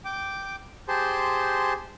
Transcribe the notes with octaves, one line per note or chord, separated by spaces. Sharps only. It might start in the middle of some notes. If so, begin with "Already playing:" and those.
G5 D6
G4 G#4 C5 A5 C6